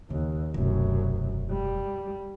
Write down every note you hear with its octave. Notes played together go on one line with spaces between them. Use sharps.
D#2 C#3
E1 C2 F#2 A3
G3